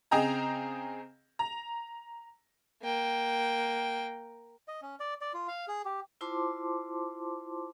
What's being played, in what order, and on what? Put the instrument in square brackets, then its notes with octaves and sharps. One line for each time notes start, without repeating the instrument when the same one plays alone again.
[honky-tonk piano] C#3 C4 G#4 D#5 G5 A#5
A#5
[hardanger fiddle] A#3 G5
[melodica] D#5
C#4
D5
D5
F4
F5
G#4
G4
[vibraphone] E4 F4 C5 A5 C6 D6